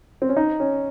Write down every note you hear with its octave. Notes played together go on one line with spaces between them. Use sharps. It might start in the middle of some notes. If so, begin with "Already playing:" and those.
C4
C#4
D#4
C#4